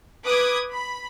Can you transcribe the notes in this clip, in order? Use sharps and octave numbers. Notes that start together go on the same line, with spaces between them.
B4 D6 D#6 G#6
B5